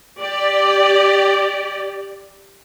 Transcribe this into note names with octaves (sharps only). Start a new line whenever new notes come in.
G4 D5